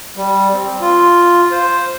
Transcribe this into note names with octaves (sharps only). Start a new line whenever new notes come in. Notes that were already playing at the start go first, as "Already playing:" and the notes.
G3
C4
F4
C5